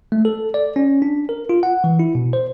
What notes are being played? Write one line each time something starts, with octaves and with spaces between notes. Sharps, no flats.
A3
A4
D5
C#4
D4
A#4
F4
F#5
E3
E4
B2
C5